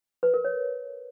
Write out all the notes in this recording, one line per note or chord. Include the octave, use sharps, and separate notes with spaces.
B4
A#4
C#5